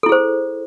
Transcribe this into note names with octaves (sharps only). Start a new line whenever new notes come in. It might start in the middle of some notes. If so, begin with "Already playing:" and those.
E4 G#4 A4 C5